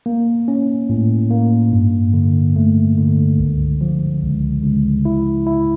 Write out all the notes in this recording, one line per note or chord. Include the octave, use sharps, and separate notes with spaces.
A#3
C#4
A2
A#3
G2
D3
A3
D3
C#2
F3
C#2
C#2
E4
E4